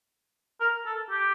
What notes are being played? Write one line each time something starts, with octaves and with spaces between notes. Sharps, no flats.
A#4
A4
G4